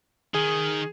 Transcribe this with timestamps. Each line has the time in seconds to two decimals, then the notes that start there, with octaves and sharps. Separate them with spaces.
0.35 D#3 G#4